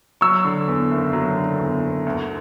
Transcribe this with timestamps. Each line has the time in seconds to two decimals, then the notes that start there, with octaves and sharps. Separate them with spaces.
0.21 F#3 C#6 E6
0.45 D3
0.68 E2
0.91 F#1
1.13 F#3
1.37 D3
1.60 E2
1.82 F#1
2.06 D2